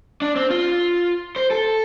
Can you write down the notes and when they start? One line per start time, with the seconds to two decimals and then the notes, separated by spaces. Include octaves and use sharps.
0.22 D4
0.36 C4
0.50 F4
1.36 C5
1.51 A4